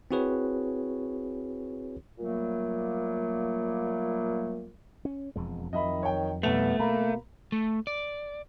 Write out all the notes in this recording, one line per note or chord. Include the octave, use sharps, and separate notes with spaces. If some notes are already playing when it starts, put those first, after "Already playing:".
C4 E4 F#4 G#4 B4 C#5
A#2 F#3 G3 A3 A#3
C#4
E1 F2 G#3
F2 D#3 F#3 D#5 E5 B5
C#5 G5
B1 G3 A3 B3 F7
B2 A#3 A#5 B5
A3
D5